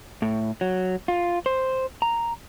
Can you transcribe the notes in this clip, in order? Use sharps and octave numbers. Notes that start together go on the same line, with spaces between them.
A2
F#3
F4
C5
A#5